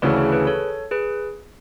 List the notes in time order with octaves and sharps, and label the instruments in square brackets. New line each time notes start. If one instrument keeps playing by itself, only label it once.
[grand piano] D2 C#3 E3 A3 C#4 [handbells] B4 D5
[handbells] G#4 B4
G#4 B4
A4 C#5
G#4 B4